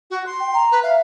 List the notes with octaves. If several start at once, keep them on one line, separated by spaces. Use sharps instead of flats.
F#4
C6
G5
A#5
B4
E5 F5